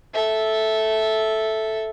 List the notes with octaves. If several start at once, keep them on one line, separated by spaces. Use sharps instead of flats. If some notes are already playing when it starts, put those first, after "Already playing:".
A4 E5